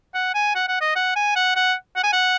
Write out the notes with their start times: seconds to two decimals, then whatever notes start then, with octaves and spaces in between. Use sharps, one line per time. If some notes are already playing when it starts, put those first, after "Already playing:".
0.14 F#5
0.34 G#5
0.55 F#5
0.68 F#5
0.81 D#5
0.95 F#5
1.16 G#5
1.35 F#5
1.55 F#5
1.96 F#5
2.03 G#5
2.12 F#5